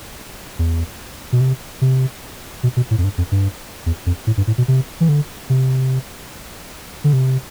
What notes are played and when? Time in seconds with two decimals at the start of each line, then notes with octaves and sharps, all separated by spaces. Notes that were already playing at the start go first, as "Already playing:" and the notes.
0.59 E2
1.32 B2
1.41 C3
1.81 C3
2.63 B2
2.77 B2
2.91 A2
2.98 F2
3.04 G2
3.18 F2
3.32 G2
3.86 E2
4.06 F2
4.27 A2
4.37 G2
4.47 A2
4.58 B2
4.68 C3
5.00 E3
5.09 D3
5.50 C3
7.04 D3
7.13 C3